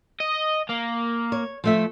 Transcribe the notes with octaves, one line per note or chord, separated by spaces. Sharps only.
D#5
A#3
C#5
F3 A3 E5